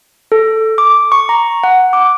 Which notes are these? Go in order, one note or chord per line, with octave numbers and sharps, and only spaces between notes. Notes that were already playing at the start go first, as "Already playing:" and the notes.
A4
D6
C#6
A#5
F#5
D6